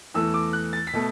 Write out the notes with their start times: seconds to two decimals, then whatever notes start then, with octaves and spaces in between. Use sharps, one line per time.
0.14 E2 E3 A3 E6
0.34 D6
0.53 F#6
0.73 A6
0.87 B6
0.93 B2 A3